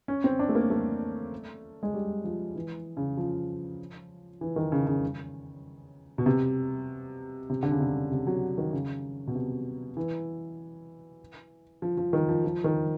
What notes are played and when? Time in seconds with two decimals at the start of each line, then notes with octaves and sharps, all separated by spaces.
0.08 C#4
0.24 C4
0.39 D4
0.49 A3
0.55 A#3
0.70 A3
1.83 G#3
1.94 G3
2.24 F3
2.55 E3
2.97 C#3
3.17 F3
4.41 E3
4.56 D#3
4.72 C#3
4.87 C#3
6.18 B2
6.26 C3
7.50 C3
7.63 D3
7.72 C#3
7.80 C3
8.11 C3
8.27 F#3
8.58 D#3
8.73 C#3
9.27 B2
9.35 C3
9.97 E3
11.82 F3
11.97 F3
12.13 D#3
12.29 F3
12.44 F3
12.64 D#3